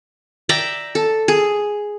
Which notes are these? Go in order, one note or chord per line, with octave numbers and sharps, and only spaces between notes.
D5 E5 G5 A#5
A4
G#4